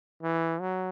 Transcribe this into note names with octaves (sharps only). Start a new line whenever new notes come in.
E3
F#3